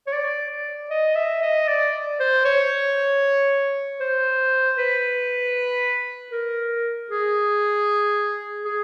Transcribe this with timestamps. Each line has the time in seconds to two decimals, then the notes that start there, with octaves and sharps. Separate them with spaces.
0.07 C#5
0.13 D5
0.90 D#5
1.15 E5
1.42 D#5
1.68 D5
2.20 C5
2.45 C#5
4.00 C5
4.78 B4
6.32 A#4
7.10 G#4
8.65 G#4